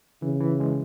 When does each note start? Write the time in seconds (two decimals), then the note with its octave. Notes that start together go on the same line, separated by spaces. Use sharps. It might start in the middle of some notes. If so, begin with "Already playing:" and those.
0.22 C#3 E3
0.41 E3
0.60 G#3